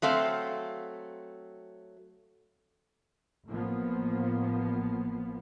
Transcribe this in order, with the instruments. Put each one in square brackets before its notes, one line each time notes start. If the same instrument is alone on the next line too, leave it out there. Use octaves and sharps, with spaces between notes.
[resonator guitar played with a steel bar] F#3 A3 C4 F5
[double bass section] A1 F3 A#3 B3